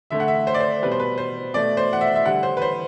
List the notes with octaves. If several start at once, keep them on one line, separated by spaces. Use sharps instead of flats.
D3 A3 E5
F#5
E5
C5
D5
C5
B2 G3 B4
C5
B4
C5
B2 A3 D5
C5
F#5
E5
E5
D3 G3 F#5
C5
B4
C5